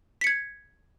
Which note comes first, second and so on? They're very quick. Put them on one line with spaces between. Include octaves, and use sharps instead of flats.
B6 C#7 G#6